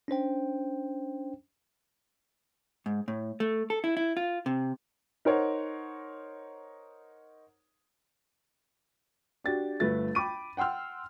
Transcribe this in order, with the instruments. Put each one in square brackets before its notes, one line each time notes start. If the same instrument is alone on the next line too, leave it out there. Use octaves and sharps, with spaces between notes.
[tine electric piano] C#4 D4 C5 G5
[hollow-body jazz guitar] G#2
A2
A3
A4
E4
E4
F4
C3
[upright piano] D#4 A#4 C5 C#5 F#5
[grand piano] D4 F#4 G4 A6
G1 A3 B4 A6
G5 B5 D6 D#7
F#5 G5 C6 E6 F6